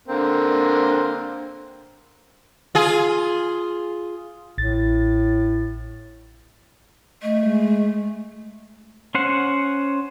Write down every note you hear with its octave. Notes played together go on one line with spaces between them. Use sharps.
D3 A#3 C4
F4 G#4
A1 A2 A6
A3 D#5
G#3
C#4 C5 F#5